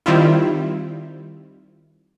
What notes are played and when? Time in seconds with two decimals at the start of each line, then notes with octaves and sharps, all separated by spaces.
0.06 D#3 G3 C4 E4 F4